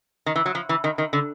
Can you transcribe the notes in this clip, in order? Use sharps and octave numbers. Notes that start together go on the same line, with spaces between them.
D#3
E3
F#3
F3
E3
D#3
D#3
D3